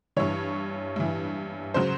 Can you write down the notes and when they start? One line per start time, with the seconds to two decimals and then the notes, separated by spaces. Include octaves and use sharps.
0.16 G2 E3 C#5
0.96 G2 E3
1.74 C#3 F#3 C5